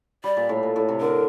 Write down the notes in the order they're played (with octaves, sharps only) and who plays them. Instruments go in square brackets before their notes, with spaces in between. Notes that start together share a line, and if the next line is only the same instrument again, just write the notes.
[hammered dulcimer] G3 [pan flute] D5
[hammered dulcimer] A#2
A2
A#2
A2
C3
[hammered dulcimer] D3 [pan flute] A#4